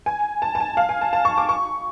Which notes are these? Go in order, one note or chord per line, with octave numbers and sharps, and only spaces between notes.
G#5
A5
A5
G#5
F5
G#5
A5
A5
C#6
D6
C#6